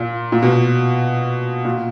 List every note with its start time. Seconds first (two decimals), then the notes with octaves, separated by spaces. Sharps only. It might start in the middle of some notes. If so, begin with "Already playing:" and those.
Already playing: A#2
0.32 A#2
0.42 B2
1.65 A#2